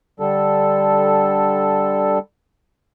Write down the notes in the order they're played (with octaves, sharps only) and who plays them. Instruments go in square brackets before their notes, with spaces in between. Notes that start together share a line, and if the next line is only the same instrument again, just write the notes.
[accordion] D3 G3 A4